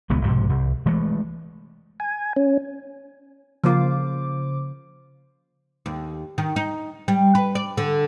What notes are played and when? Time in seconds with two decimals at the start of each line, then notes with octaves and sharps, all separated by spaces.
0.10 D#1 C#2 G#3 B3
0.24 B1 G#2 C3 F3
0.49 C2
0.86 E3 G#3 A3
2.00 G#5
2.36 C#4
3.64 C#3 F3 A#3 F4 C5 D6
5.86 D#2
6.38 D#3
6.56 D#4
7.08 G3
7.35 B4
7.55 D5
7.77 D3